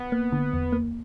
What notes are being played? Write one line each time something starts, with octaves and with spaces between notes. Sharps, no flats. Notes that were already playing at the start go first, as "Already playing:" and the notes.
Already playing: B3
A#3
D3
E2
A#3